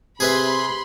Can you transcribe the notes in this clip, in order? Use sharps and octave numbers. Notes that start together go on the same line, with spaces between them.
C3 G#4 B4 E5 B5 C6